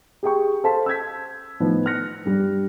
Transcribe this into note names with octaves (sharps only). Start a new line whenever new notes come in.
G4 G#4 G5 C#6
A4 C5 F5 A5 C6 B6
E6 G6 G#6 B6
A2 D#3 F3 B3
F6 F#6 A#6 C#7
G2 G3